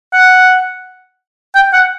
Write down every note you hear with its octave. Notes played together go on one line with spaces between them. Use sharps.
F#5
G5
F#5